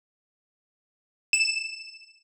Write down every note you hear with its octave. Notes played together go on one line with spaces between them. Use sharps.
E7